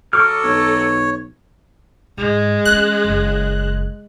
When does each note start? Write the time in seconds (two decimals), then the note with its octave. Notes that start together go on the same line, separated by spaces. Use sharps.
0.13 F#3 A4 C#6 D6 F6
0.44 B1 C#5
2.17 G#2 G#3
2.65 E3 C#4 F#6
3.05 F#1